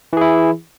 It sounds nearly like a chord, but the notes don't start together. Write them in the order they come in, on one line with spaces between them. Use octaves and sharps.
E3 G#4 E4